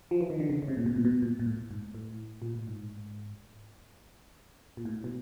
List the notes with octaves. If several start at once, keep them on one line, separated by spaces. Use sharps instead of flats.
F3
E3
D#3
D3
C#3
C#3
C3
A#2
B2
A#2
B2
A#2
A#2
A2
G#2
A2
A#2
A2
G#2
A#2
A2
B2